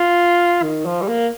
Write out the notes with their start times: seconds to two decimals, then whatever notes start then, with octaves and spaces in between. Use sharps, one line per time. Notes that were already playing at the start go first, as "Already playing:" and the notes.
Already playing: F4
0.63 D#3
0.85 F3
1.02 G3
1.08 A#3